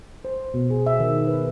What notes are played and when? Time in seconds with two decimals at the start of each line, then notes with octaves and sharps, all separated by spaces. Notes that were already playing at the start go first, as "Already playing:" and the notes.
0.25 C5
0.54 B2
0.70 G#4
0.86 E5
1.00 D#3
1.27 B4